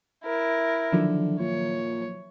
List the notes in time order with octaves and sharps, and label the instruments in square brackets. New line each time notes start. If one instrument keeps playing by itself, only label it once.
[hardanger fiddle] E4 A#4
[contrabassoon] D3 [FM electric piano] D#3 F3 F#3
[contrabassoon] A#2 [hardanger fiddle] C#5